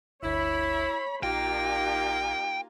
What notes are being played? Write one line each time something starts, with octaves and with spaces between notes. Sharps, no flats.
G1 D2 E4 C#5 B5
A#1 A#3 D#4 F4 G4 G5